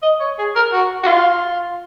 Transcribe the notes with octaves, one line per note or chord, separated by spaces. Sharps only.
D#5
C#5
G#4
A#4
F#4
F#4
F4